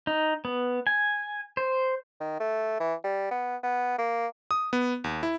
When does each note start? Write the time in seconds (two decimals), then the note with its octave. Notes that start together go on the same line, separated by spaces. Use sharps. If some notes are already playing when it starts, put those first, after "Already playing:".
0.07 D#4
0.45 B3
0.87 G#5
1.57 C5
2.20 D#3
2.40 A3
2.80 E3
3.04 G3
3.31 B3
3.63 B3
3.98 A#3
4.51 D#6
4.73 B3
5.04 D#2
5.23 E4